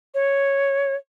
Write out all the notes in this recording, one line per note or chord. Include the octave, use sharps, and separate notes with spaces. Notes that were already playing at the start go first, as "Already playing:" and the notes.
C#5